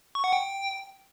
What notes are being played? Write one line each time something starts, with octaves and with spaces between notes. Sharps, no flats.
C#6
F#5
G5